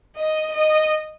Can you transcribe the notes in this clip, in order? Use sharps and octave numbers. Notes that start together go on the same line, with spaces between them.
D#5
D#5